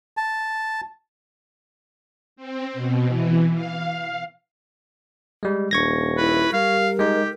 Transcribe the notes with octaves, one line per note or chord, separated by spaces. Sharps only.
A5
C4
B2
E3
F5
G3 G#3
D#1 D4 C#6 G#6 A#6
E4 B4
G3 A#4 F5
G#3 D#4 G4